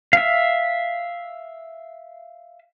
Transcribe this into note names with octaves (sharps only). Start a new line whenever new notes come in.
E5 F5